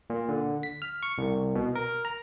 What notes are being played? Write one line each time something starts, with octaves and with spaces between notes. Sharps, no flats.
A#2
D3
B6
F6
C#6
C2
B2
A#4
A#5